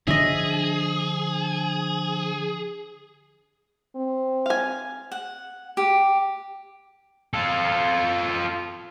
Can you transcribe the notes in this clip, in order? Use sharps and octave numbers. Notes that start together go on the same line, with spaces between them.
D3 F3 D4 G#4 D#5 E5
C4
F5 G#5
F#5
G4
F4 A4